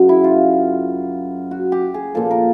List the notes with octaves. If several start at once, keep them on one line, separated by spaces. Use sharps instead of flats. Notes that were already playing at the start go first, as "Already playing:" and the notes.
Already playing: F#2 C#3 F#3
E4
F4
F#4
G4
G#4
A#2 F3 A4
A#4